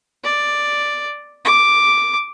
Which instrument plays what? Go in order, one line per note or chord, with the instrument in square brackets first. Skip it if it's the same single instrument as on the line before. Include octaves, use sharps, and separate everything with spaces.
[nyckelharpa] D5
D6